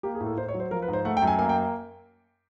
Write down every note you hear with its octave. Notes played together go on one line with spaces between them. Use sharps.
A#3 G4
G#4
A2
A4
A2 C5
C#5
F#3
C5
F3 A#4
B4
G#2
C5
A3 F#5
G5
F#2
G#5
A#3 G#5
G5